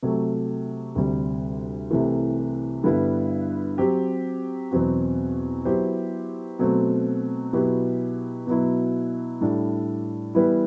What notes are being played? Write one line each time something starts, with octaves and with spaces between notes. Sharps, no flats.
C3 F#3 A3
D2 C3 G3
C2 C3 E3 A3
G2 D3 G3 B3 E4
F#3 C4 G4
E2 B2 F#3 C4 F#4
F#3 B3 E4 G4 C5
B2 F#3 A3 C4
B2 F#3 B3 E4 G4
B2 F#3 B3 E4
A2 G3 D4 A4
E3 G3 B3 E4 B4